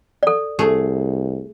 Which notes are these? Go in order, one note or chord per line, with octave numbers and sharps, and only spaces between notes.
A4 D5
C2 A3 G#4